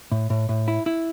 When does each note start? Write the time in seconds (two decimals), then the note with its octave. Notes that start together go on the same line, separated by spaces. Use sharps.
0.12 A2
0.30 A2
0.49 A2
0.68 E4
0.86 E4